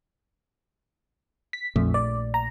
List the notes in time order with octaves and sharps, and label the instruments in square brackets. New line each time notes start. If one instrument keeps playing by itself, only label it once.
[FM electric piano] B6
[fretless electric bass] A#1 A#2 A3 [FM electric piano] F2
[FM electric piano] D5
A#5